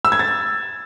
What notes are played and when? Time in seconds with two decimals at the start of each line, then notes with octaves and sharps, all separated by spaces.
0.05 E6
0.12 G#6
0.19 A6